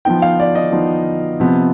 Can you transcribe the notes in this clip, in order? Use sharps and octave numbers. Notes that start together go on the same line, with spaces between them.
F3 B3 D#4 G5
F5
D5
D#5
F3 B3 D#4
C3 F3 B3